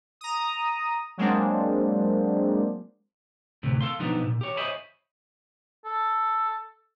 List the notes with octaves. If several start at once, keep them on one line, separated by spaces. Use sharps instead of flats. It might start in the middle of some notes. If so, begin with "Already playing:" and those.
A#5 D#6
F#3 G#3 A#3 C4 D4
D2 A2 C3 E3
A4 F5 C6
B1 F3 B3 D4 D#4 G4
A#2
G4 C#5
C5 C#5 D#5 E5 G#5 B5
A4